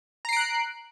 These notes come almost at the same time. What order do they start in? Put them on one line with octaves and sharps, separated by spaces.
A#5 C7 D7 F#6